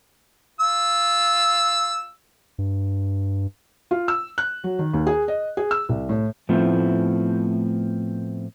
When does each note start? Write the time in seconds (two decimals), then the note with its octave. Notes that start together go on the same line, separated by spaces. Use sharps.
0.60 F4 E6
2.58 G2
3.91 F4
4.08 E6
4.38 F#6
4.64 F#3
4.79 D#3
4.93 D#2
5.07 G#4
5.28 D#5
5.57 G#4
5.71 E6
5.89 C2
6.09 A2
6.49 A2 F3 A3 B3 C4 E4